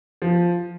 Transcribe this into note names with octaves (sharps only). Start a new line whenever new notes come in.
F3